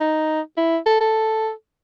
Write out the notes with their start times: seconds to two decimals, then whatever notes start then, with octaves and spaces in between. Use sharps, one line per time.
0.01 D#4
0.57 E4
0.86 A4
1.01 A4